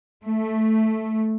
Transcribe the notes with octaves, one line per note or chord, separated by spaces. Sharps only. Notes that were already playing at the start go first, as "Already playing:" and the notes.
A3